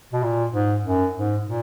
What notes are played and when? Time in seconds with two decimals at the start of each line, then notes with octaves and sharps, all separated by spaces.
0.13 B2
0.23 A#2
0.53 G#2
0.85 F#2
1.16 G#2
1.47 A#2